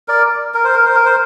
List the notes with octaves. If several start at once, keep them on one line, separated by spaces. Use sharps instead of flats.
A#4 D5
A#4
C5
A#4
C5
A#4
C5